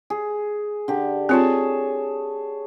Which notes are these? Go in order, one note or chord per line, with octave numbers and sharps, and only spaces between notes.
G#4
D3 G4
C4 F4 G#4 C#5 A5